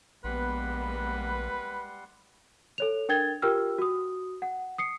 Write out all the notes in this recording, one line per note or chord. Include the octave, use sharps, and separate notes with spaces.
A#1 G3 G#3 A#3 B3 B4 F#5 C6
A4 C#5 F7
D4 A#4 G5 G#6 A6 G7
F4 G4 A#4 G5 E6 F6
F#4 D#6
F#5
D#6 C7 C#7